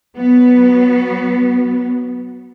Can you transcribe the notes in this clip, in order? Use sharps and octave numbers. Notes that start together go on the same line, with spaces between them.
F#3 B3